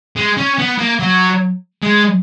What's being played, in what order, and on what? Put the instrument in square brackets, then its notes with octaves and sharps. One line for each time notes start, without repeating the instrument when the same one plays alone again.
[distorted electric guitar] G#3
C#4
B3
A#3
F#3
G#3